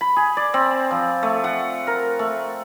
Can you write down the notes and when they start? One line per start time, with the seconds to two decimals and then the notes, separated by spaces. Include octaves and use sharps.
0.01 B5
0.16 G#4
0.37 D5
0.54 C4
0.91 F3
1.23 A3
1.44 F#5
1.87 A#4
2.19 A3